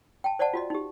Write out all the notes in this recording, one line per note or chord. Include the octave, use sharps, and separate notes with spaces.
G5 A5
C5 D5 D#5 F#5 A5
F4 F#4 D#5
D#4 G4